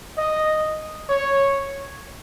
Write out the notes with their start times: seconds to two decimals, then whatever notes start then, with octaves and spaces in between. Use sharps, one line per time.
0.17 D#5
1.09 C#5